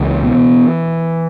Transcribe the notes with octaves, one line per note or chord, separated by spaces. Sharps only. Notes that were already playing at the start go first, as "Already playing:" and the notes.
Already playing: C#2 E3
B2